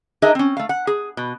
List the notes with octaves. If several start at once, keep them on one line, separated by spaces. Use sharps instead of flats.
D4 D#4 G#4 A#4 D#5 E5
C4 C#4
A3 F5
F#5
G#4
B2